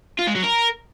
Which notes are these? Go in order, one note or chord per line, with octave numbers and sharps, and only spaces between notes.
F4
G#3
F#3
A#4